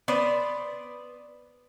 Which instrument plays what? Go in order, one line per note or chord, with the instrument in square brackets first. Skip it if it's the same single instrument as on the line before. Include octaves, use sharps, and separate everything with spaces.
[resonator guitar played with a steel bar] B3 C5 D5